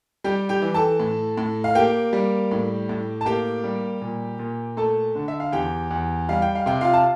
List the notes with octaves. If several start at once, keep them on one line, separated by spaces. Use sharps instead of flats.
G3 G4 G5
G4 G5
E3
A4 A5
A2
A2
F5
A#3 G4 G5
G3
A2
A2
A5
A#3 G4 G5
G3
A#2
A#2
A3 A4 A5
D3
E5
F5
E2 G4 G5
E2
G3 F5
G5
F5
C3 G5
F4 F5
A5